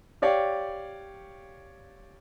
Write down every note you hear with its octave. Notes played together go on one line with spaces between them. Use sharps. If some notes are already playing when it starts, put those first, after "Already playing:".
G4 C#5 D5 F5 G5